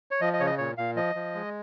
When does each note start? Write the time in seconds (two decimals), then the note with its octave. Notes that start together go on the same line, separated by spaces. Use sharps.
0.11 C#5
0.21 F3 D#5
0.33 D#5
0.40 C#3 C#5
0.46 D#5
0.58 A#2 C#5
0.78 A#2 F5
0.96 F3 D#5
1.15 F3
1.35 G#3